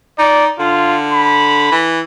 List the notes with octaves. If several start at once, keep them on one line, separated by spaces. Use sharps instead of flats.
D#4 D5
D3 F4
B5
E3